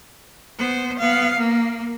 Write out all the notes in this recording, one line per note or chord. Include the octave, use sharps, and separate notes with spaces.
B3 C5
B3 F5
A#3